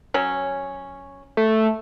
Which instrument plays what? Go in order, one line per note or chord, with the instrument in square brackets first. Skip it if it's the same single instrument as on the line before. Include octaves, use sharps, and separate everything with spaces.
[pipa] F#3 C#4
[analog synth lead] A3